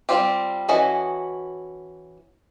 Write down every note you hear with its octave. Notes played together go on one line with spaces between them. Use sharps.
G3 C4 F4 G4
E3 C#4 F#4 A4 D#5